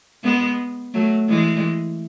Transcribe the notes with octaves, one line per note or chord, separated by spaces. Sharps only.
G#3 B3
F#3 A3
E3 G#3